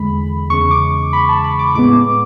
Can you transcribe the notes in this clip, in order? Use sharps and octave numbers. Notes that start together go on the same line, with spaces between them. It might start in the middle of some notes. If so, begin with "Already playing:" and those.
Already playing: E2 D3 G#3 B5
E2 C#3 G#3 C#6
D6
B5
A5
B5
D6
A2 G#3 B3 D6